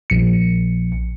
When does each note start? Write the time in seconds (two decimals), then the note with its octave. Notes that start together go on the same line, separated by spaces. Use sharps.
0.10 A#1 C#7